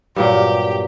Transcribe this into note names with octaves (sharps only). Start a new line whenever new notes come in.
G2 A#2 F#3 G4